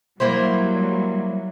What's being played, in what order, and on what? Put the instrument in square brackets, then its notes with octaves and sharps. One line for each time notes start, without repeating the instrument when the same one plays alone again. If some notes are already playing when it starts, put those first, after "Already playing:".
[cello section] F#3 G3 [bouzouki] A#3 E4 C5